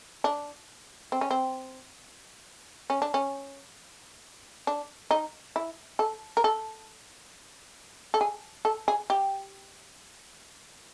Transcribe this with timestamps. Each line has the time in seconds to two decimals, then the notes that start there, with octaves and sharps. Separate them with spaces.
0.24 D4
1.12 C4
1.21 C#4
1.31 C4
2.90 C#4
3.02 D4
3.14 C#4
4.67 D4
5.11 D#4
5.56 E4
5.99 A4
6.37 A#4
6.44 A4
8.14 A4
8.21 G#4
8.65 A4
8.88 G#4
9.10 G4